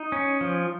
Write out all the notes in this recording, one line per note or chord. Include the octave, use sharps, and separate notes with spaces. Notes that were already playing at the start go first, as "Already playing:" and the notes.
Already playing: D#4
C#4
F3